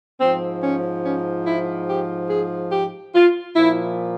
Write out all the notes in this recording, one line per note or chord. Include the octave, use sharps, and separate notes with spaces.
G#2 F3 C4
C#4
C#4
E4
G4
G#4
G4
F4
A#2 F3 E4